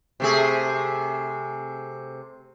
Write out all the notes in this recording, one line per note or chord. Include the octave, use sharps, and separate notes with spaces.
C3 A3 G#4